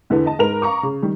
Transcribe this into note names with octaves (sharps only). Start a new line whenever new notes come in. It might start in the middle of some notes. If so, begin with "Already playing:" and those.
E2 D3 E3 B3
D#5 A5
G#2 A#4 B4 F7
F5 A#5 C#6 D6
C#3
D#3 G3